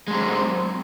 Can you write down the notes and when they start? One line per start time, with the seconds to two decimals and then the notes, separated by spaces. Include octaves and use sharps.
0.08 G#3
0.11 F#3
0.14 C4